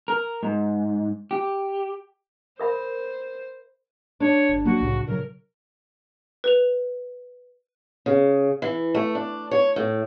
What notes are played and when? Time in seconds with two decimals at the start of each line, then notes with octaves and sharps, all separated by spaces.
0.08 A#4
0.43 G#2
1.31 G4
2.60 A#4 C5 E5 B5
4.20 D4 C#5
4.49 G1
4.65 F#3 A#3 F#4
4.80 C2 A2 C#3
5.07 A#2 C#3 F#3 A#4
6.44 B4 F7
8.06 C#3
8.62 E3
8.95 A3
9.15 D4
9.51 C#5
9.76 A2